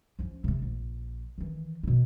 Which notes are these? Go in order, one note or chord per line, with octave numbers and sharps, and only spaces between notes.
F3 C#4
C3 A3
A#1
D#3 E3
B2 A#3